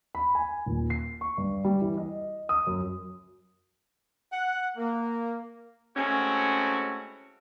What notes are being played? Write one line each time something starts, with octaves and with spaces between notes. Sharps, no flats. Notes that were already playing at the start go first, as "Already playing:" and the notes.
B5
G#5
D#1
C7
C#6
G2
G3
E3
D#5
D#6
F#2
F#5
A#3
G#3 A3 C4 C#4 E4 F#4